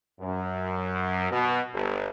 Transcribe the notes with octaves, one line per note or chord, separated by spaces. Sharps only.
F#2
B2
G1